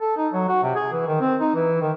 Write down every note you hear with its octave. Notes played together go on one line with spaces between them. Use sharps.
A4
D#4
F#3
F#4
C3
G#4
E3
D#3
C4
D#4
E3
D#3